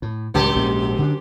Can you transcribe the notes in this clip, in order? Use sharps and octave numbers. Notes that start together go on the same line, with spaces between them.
A2
C#2 F#2 A2 D#3 G4 C5
A#1 G#2 G#3
D3 D4